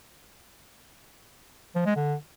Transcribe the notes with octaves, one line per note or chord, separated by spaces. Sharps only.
F3
G#3
D3